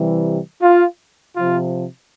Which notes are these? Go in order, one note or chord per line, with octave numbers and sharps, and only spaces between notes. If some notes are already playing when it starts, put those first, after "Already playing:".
Already playing: C3 E3 G3
F4
C3 F3 F4